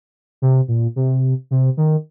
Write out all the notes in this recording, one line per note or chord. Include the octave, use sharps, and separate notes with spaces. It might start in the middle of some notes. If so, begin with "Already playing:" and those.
C3
A#2
C3
C3
D#3